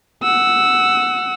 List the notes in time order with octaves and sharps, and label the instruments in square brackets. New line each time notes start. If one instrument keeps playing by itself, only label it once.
[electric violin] F#5 E6